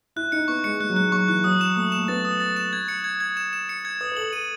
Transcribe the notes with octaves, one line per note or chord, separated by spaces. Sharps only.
E4 F#6
D#4 C#7
B3 C#6
G#3 C#7
G#3 F#6
F#3
G#3 F#6
F#3 C#6
E3 F#6
F#3 D#6
E7
A3 D#6
E7
A3
B3 A6
D#6
A6
E7
G#6
C#7
G#6
G#6
E7
E7
C#7
G#6
B4 D#6
B4
A4 F#7
A4 D#7